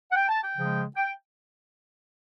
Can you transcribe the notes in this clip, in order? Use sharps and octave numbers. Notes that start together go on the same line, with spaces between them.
F#5
G5
A5
G5
C#3 F3 G#3
G5